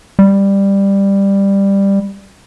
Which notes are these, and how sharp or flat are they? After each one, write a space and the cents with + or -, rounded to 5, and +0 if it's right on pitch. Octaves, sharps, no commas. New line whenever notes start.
G3 +10